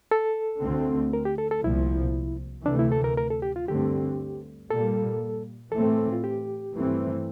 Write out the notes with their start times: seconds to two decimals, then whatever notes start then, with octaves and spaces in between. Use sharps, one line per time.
0.11 A4
0.62 D2 D3 A3 C4
1.13 A#4
1.25 G4
1.38 A4
1.51 A4
1.64 C2 A#2 F3 E4
2.65 D2 C3 E3 A3 D4
2.79 E4
2.92 A4
3.04 A#4
3.18 A#4
3.30 A4
3.42 G4
3.56 F4
3.68 G2 D3 A3 C4 G4
4.70 A#2 G3 A#3 A4
5.72 A2 E3 A3 C4 A4
6.12 F4
6.24 G4
6.75 G2 E3 A3 C4